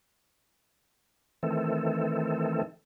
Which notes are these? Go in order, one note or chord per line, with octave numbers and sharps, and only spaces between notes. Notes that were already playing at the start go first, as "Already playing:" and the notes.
D#3 E3 A3 C4 A4